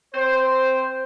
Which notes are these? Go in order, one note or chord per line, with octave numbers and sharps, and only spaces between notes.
C4 C5